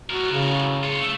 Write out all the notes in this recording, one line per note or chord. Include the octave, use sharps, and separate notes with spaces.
A2 F#4 A#4
C#3
F4 C#5
A3